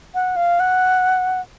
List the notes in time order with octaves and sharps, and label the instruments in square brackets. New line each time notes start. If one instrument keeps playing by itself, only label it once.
[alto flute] F#5
F5
F#5